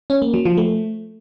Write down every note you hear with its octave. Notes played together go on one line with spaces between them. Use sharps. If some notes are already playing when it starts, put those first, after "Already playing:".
C#4
A#3
F#3
F3
A3